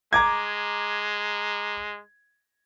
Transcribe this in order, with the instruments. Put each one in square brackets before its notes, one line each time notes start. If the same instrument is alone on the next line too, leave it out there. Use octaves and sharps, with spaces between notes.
[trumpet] G#3 [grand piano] A#5 D6 G#6